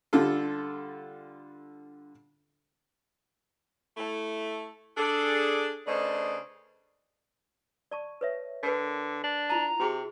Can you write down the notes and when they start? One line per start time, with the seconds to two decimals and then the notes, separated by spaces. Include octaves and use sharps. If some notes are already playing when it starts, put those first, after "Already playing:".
0.13 D3 G3 F4 A4
3.97 A3 E4
4.97 D4 G#4 A4
5.86 C#3 A3 D4 B4 C5 D#5
7.91 D5 A5 C#6
8.21 B4 C#5 E5
8.63 D3 A#4 B4
9.24 D4
9.50 E4 F4 A5 A#5
9.80 C3 F#4 G#4 G5